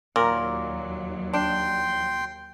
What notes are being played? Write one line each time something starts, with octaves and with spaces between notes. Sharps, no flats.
D#2 A#2 F#3 A#4
D4 G5 C6